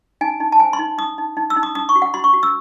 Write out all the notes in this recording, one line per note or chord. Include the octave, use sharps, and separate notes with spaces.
D#4 G#5
D#4
A5
C5 G#5
C6
D#4
D#4 D#6
D#4
D#4
E6
D#4
D#6
D#4 D#6
C#6
F#4
F#5
F#4 C6
C#6
F#4
E6